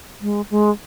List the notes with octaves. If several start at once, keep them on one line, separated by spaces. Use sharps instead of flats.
G#3
G#3